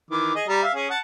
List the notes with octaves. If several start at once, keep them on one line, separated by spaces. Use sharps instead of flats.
D#3 E3 D6
G#4 D#5
G3 A#5
E5 F5
C#4 G#4
F#5 A5